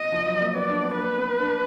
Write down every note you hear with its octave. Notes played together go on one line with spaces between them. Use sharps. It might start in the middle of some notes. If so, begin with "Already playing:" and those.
Already playing: D#5
F3
F#3
A#3
B3 D5
D4
B3
A#3 B4
B3
D4